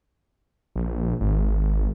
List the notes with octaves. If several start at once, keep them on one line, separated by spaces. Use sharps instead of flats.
A#1
G#1